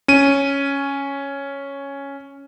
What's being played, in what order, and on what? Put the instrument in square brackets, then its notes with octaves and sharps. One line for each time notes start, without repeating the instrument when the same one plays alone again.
[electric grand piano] C#4 D#7